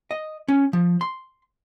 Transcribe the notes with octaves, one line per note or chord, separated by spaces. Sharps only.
D#5
C#4
F3
C6